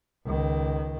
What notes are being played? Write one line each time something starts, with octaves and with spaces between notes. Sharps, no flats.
C#2 D#3